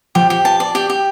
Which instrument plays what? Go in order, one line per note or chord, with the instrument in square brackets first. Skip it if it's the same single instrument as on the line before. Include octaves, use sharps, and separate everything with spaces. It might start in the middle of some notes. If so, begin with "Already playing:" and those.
[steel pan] F3 [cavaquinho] G4
[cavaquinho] G4
A5
D5
G4
G4